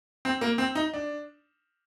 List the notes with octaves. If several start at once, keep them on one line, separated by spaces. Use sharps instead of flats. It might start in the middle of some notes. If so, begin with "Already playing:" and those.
C4
A#3
C4
D#4
D4